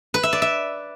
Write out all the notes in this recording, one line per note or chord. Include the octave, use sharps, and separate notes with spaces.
B4
E5
D5
E5